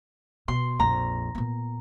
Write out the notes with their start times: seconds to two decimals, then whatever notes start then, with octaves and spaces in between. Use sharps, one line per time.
0.48 B2 C6
0.79 A#1 F2 A#5
1.35 A#2 B3